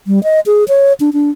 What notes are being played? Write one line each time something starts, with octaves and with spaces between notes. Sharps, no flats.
G3
D#5
G#4
C#5
D4
D4